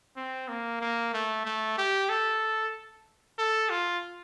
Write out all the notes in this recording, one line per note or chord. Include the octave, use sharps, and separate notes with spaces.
C4
A#3
A#3
A3
A3
G4
A4
A4
F4